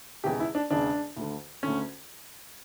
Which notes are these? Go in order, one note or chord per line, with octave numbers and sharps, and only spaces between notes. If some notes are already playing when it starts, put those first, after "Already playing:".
E1 E2 C#3 G4
E4
D4
E1 E2 C#3 D4
D2 D3
D2 D3 C#4